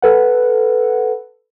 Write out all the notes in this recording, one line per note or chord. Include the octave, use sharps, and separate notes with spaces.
A4 B4 F#5